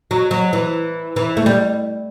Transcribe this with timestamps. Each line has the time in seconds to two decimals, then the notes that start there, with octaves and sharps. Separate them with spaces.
0.11 F#3
0.31 F#3
0.53 E3
1.16 E3
1.37 A3
1.46 G3